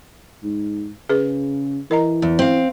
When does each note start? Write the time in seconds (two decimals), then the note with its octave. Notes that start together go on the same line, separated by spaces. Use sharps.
0.44 G#2
1.09 C#3 G#4 B4
1.91 E3 A#4 D#5 A#5
2.22 E2
2.39 C4 F5